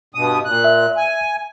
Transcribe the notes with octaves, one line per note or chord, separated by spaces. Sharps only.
G2 B2 D#6
A#2 F#6
E5
G#5